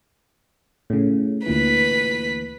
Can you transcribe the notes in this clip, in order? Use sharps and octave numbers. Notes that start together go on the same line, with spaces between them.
A2 C#3
D2 A#2 E3 B4 B6